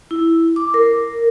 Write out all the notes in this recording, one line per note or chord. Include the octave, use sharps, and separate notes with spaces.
E4
D6
A#4